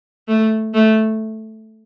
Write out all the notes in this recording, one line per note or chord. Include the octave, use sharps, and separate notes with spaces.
A3
A3